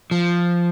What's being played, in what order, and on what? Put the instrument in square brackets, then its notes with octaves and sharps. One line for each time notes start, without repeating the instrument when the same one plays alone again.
[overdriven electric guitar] F3